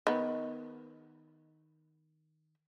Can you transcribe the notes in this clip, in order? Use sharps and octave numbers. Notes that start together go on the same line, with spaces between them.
D#3 B3